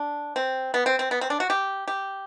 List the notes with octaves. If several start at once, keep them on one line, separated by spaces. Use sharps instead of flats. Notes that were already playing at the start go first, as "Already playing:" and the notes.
Already playing: D4
C4
B3
C4
C4
B3
C4
D4
F#4
G4
G4